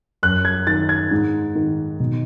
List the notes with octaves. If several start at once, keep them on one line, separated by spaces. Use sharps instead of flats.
F#2 F#6
G#6
D#3 A6
G#6
G#2
D#3
B2